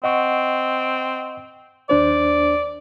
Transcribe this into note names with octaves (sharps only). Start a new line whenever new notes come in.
C4 D#5 F#5 C#6
D#2 D4 C5 D5